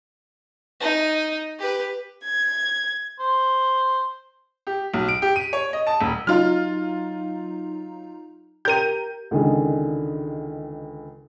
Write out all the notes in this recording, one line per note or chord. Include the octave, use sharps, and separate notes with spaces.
D#4
G4 B4
G#6
C5
G4
B1
D7
G4
D#7
C#5
D#5
A5
D#1
F#3 D#4 F4 A#5 F6
G4 A#4 G6 D#7
C#2 D3 D#3 G#4